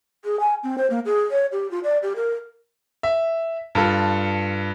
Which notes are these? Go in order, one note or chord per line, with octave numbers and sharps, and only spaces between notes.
G#4
G#5
C4
C5
A#3
G#4
C#5
G4
F4
D5
G4
A#4
E5
G2 F4 A4